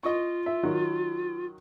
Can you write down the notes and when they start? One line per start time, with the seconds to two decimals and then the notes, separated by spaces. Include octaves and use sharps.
0.03 F4 D#5 C#6
0.46 E5
0.63 D#3 F#3 F#4